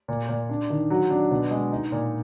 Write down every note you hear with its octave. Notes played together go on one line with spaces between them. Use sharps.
A#2
A#2
D4
D#3
F#3
D4
B2
G#3
D#4
A#2